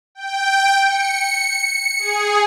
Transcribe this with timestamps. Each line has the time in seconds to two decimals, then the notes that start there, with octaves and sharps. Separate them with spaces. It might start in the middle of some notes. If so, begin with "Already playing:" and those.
0.15 G5
0.85 C#7
1.99 G#4